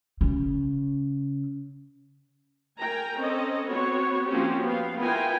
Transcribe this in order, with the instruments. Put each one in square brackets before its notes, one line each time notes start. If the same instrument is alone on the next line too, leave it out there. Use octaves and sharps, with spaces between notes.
[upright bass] C#3
[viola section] A#4 G5 G#5 A#5
C4 C#4 A4 D#5
B3 C4 F#4 C#5
F3 A#3 C4 C#4 F#4 G4
B3 F5
B3 E4 F4 A#4 G5 G#5